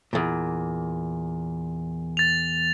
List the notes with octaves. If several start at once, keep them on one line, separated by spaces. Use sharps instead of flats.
E2 A#2
A6 F7